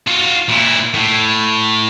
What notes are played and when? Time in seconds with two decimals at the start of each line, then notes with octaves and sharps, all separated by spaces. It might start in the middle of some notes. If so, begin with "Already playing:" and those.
0.08 F4 F#4
0.49 A#2 E4
0.94 A2